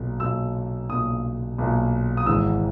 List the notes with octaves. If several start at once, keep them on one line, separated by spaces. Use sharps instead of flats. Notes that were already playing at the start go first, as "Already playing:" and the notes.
Already playing: B1 A#2
B1 A#2 E6
B1 A#2 D#6
B1 A#2
D#6
G#1 G#2 E3 E6